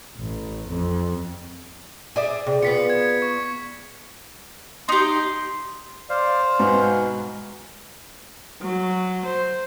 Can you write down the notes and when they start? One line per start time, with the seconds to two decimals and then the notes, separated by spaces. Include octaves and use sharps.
0.18 A1
0.69 F2
2.16 G#4 D5 E5
2.46 C3 G#4 D5
2.62 B3 F4 B6 C#7
2.90 G#6
3.22 C#6
4.89 D#4 G4 C6
6.10 C5 D5 F5
6.59 G#2 B2 G#5
8.61 F#3
9.26 C5